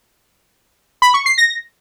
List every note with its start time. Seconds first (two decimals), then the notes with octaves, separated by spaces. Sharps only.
1.02 B5
1.14 C#6
1.26 C7
1.38 A#6